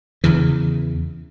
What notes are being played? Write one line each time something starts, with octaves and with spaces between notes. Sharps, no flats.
E2 C#3 E3